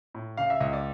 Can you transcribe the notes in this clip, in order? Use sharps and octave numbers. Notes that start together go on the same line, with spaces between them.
A2
C#3 F5
E5
C#2 D#5
D5